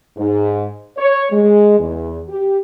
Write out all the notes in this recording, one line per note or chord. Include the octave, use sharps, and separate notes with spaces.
G#2
C#5
G#3
E2
G4